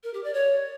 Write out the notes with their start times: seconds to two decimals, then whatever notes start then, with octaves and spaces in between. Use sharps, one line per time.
0.04 A#4
0.14 G4
0.24 D5
0.34 C#5